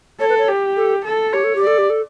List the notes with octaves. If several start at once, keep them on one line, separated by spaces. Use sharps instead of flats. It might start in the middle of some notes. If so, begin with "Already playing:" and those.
A4 C#5
B4
C#5
G4
A4
A4
G4 C#5
A4
G4
D5
A4
G4
A4